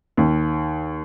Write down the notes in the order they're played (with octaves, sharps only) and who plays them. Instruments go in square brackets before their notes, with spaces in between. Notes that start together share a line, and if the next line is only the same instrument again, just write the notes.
[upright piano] D#2